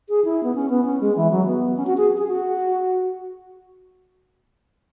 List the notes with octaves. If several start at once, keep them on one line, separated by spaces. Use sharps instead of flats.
G#4
E4
B3
C#4
B3
C#4
G#3
E3
F#3
B3
C#4
F#4
G#4
G#4
F#4